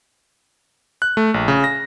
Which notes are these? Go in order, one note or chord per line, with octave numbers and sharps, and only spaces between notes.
F#6
A3
A#1
C#3
A#6